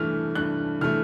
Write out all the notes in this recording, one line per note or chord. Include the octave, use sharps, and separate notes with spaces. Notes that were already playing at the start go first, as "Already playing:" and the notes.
Already playing: G2 E3 A3 F6
G2 F#6
E3 A3 F6